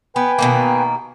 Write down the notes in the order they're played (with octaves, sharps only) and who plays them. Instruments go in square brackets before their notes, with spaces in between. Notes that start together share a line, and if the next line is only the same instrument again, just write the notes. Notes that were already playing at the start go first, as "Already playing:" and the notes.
[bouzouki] B3 [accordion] B4 G5 G#5
[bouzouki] B2 D#3 A#3